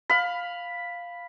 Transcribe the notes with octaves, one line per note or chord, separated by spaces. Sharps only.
F5 B5